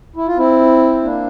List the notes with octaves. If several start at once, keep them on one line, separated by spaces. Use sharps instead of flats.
E4
F4
C4 E4
A#3 D4